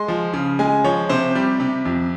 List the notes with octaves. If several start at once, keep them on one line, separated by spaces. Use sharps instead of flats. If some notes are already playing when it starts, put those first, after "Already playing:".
Already playing: G#3 C6
F3
C#3
G#3 G#5
F3 C#5
C3 C5
G3
C3
F2